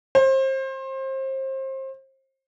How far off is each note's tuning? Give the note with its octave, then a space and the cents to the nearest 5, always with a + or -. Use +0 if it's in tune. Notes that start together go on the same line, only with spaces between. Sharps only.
C5 +30